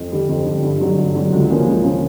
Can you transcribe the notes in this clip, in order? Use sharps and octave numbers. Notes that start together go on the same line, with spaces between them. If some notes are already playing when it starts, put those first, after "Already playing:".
Already playing: F2
D3 G3
F2
D3 G3
G2
D3 F#3
G2
D3 F#3
C#2
C#3 F3 A#3
C#2
C#3 F3 A#3